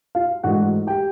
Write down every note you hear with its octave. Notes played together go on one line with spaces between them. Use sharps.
F4 F5
G#2 E3 A3 D4 F#4 F#5
G4 G5